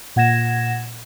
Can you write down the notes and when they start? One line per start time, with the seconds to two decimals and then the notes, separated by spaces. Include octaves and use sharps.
0.16 A#2 F#5 G#6 A#6 E7